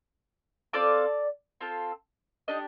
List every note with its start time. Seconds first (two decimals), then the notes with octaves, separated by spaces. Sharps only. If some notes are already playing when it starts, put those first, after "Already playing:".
0.73 C4 F4 A4 D5 D6
1.61 C4 F4 A4
2.48 D4 D#4 G4 D#5